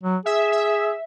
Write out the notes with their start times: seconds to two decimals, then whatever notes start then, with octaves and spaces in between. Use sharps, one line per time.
0.04 F#3
0.26 G#4 E5
0.52 E5